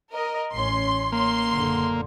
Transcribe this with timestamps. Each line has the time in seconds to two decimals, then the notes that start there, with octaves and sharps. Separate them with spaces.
0.12 A#4 D#5
0.54 A1 C#4 C6
1.12 A#3 C6
1.49 F#1 A#2 D3